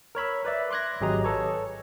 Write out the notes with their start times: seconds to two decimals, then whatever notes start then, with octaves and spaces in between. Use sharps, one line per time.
0.15 A#4 C#5 B5 E6
0.45 B4 D5 E5
0.71 C6 D6 F#6 G#6 A#6
1.01 G#1 F#3 G4 G#4 D#5 A#5
1.24 A4 B4 C#5